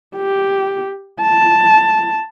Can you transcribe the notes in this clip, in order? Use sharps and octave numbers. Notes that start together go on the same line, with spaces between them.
G4
A5